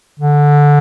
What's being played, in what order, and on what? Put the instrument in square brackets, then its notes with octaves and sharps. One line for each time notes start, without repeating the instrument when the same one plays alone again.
[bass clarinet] D3